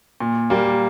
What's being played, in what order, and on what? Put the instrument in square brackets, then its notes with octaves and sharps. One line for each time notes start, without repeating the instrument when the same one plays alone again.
[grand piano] A#2
G3 A#3